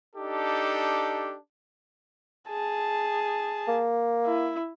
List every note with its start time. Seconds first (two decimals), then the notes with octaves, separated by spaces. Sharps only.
0.16 D4 D#4 G4 A4
2.49 G#4 A5
3.68 A#3
4.26 E4